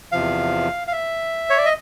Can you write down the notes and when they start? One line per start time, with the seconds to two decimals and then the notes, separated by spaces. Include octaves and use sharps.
0.12 E2 C3 F3 F5
0.87 F5
0.92 E5
1.50 C#5
1.57 D5
1.65 D#5